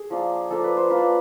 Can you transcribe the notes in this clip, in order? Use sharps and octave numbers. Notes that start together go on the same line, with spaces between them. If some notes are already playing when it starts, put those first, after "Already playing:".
Already playing: G#4
F3 A#3 D4
F3 A#3 D4 A4
B4
C5
F3 A#3 D4 B4